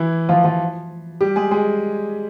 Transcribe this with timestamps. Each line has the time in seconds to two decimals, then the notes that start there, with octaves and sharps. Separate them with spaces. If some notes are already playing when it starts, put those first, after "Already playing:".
Already playing: E3 E4
0.29 F3 F4
0.44 F3 F4
1.21 G3 G4
1.36 G#3 G#4
1.51 G#3 G#4